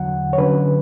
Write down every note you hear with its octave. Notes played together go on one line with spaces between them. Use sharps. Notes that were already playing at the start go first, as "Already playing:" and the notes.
Already playing: E2 D3 F#3 F#5
C#5
D3 F#3 C#4 B4